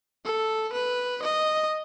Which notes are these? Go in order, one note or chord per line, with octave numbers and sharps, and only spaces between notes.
A4
B4
D#5